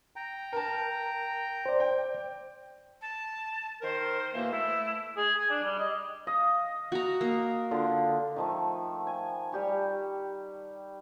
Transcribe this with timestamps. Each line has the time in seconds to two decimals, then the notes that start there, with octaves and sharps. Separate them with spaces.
0.16 G5 A#5
0.53 A#4 A5
1.66 C5 D5
1.80 G5
3.02 A5
3.82 D#3 A#4 C5
4.34 B2 E3 A#3
4.52 A3 E4
5.17 G#4
5.38 G#5
5.50 D4
5.63 G3
5.79 D#5
6.27 D#5 F5
6.92 F#4 A#5
7.21 A#3
7.71 D3 F4
8.36 D#3 F3 A3
9.07 G#5
9.52 G3 G4 C#6